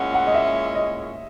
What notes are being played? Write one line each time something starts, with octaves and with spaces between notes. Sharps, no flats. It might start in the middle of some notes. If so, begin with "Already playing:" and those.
Already playing: A#2 G#3 C#4 E4 F#5
F#5
D#5
E5
D#5